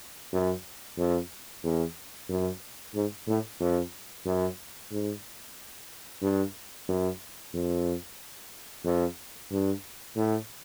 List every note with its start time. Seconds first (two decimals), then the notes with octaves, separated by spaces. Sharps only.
0.33 F#2
0.98 F2
1.63 E2
2.30 F#2
2.95 G#2
3.28 A2
3.61 F2
4.26 F#2
4.91 G#2
6.22 G2
6.89 F#2
7.54 F2
8.85 F2
9.51 G2
10.17 A2